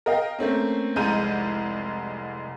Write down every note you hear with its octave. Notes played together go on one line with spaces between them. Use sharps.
A#4 D#5 F5 G5
A3 A#3 C4 C#4
F1 C2 G#3 A#5 G6 D#7